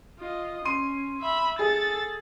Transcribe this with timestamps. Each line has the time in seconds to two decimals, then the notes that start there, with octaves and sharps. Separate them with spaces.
0.19 F4 D#5
0.65 C#4 C6 D#7
1.21 E5 B5
1.59 G#4 A4 A6